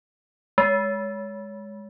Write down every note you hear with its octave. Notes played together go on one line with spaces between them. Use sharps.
G#3